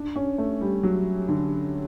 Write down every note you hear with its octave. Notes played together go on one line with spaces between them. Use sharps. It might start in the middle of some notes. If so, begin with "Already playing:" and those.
Already playing: D4
C#4
A3
G3
F#3
D3